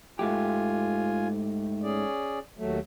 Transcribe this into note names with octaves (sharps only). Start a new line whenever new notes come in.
G#2 A3 F4 G4 G#5
C#4 G#4 D5
D#2 F#3 A3